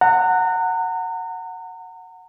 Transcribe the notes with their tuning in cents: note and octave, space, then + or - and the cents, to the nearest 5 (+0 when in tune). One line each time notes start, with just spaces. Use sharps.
F#5 +0 A#5 -35